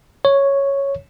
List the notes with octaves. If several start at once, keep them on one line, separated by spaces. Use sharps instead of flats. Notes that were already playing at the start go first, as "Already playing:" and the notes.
C#5